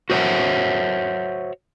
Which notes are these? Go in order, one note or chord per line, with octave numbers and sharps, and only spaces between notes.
F#4 C5 C#5 E5 F#5